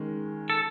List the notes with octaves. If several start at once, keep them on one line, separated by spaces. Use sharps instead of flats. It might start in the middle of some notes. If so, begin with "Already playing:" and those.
Already playing: D#3 G#3 C#4
A4